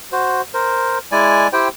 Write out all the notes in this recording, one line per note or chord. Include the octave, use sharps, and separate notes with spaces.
F#4 C5
A#4 C5
G#3 E4 D5 G#5
E4 G4 C5 G5